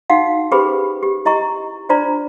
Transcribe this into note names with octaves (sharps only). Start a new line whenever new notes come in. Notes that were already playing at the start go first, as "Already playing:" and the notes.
D#4 F#4 F5 F#5
C#4 G4 G#4 B4 C5 B5
G4
E4 D#5 A#5 C#6
D4 F4 C5 D5 A#5